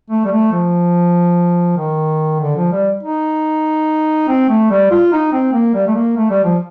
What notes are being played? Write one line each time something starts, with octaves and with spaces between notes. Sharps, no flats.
A3
G3
A3
F3
D#3
D3
F3
G3
D#4
C4
A3
G3
F4
D#4
C4
A#3
G3
A3
A#3
A3
G3
F3